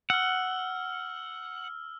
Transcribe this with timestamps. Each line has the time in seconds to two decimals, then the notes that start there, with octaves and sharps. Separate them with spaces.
0.10 F#5 E6 F6